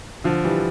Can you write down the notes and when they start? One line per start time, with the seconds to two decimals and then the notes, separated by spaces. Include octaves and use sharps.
0.24 D3 F3
0.44 E3 G3